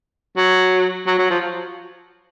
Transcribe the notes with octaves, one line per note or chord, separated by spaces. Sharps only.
F#3
F#3
F#3
F3